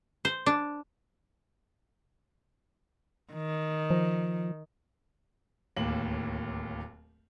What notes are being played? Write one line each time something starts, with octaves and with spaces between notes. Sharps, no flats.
C5
D4
D#3
F3
D1 D#2 A2 A#3 F#7